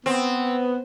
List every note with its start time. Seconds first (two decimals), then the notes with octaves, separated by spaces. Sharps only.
0.06 B3 C4